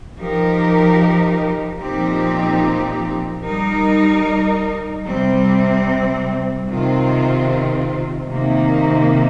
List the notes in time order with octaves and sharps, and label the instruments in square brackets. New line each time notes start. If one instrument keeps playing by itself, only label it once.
[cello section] F3 D#4 G4 A#4
A#2 F3 C4 D#4 G4
G3 D#4 A#4
C3 G3 C4
C3 D#3 C4 F4
C3 D#3 A#3 D#4